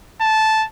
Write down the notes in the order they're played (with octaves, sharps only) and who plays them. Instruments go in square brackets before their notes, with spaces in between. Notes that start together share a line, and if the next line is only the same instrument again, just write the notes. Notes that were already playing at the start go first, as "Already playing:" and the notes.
[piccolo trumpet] A5